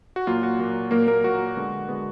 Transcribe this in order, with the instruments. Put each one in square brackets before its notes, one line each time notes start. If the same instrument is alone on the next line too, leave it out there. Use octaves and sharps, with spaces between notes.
[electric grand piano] F#4
A#2 F#3 A#3 F4
F#4
A#2 F#3 A#3
A#2 F#3 A#3 A#4
A#3 A#4
A#2 F#3 A#3 F#4
D3 G#3 B3
D3 G#3 B3